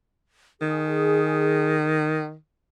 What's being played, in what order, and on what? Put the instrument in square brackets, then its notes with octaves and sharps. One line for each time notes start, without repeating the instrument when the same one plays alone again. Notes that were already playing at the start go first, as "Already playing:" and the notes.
[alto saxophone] D#3 [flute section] G#4